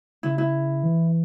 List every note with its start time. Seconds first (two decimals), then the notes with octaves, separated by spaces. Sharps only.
0.23 C#3 E4
0.38 E4
0.83 E3